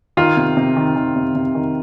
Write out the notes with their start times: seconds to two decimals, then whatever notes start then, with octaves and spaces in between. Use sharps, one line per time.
0.17 D#3 F4
0.37 C3
0.57 C3
0.76 D#3
0.96 D#3
1.16 C3
1.35 C3
1.55 D#3